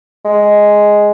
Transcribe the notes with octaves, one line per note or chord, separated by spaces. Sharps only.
G#3